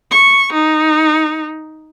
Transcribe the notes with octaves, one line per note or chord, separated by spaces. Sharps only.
C#6
D#4